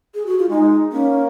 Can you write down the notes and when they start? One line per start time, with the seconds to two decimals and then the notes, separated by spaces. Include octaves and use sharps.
0.15 G#4
0.26 F#4
0.39 F4
0.50 G#3 D#4
0.92 A#3 C#4